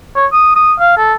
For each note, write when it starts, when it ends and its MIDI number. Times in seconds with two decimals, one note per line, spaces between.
0.16 0.26 73
0.32 0.55 87
0.56 0.73 87
0.79 0.96 77
0.97 1.14 69